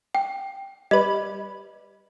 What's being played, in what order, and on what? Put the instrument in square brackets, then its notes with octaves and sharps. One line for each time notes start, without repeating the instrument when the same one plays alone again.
[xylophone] G5
[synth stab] G3 B4 [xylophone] D#5